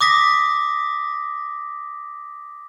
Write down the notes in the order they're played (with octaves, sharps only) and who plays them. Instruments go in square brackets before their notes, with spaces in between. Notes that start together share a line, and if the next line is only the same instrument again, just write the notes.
[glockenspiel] D6 D#6 A#6 B6